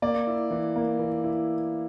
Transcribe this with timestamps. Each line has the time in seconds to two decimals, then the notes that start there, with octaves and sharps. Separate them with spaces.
0.02 A#3 D5
0.27 E4
0.51 E3
0.76 A#3
0.99 E3
1.24 E4